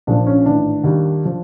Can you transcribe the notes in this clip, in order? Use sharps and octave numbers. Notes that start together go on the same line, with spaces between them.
A#1 A#2 F3 D4
C#4
A1 G#2 D#3 D4
D#2 D#3 G3
F3